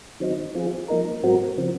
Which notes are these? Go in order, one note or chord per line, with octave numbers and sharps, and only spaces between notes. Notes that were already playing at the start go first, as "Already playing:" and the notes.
D#3 F#3 C4 D#4
F3 C4 F4 G#4
F3 A#3 D#4 A#4
G#2 F#3 C4 F#4 A#4
C#3 F3 C4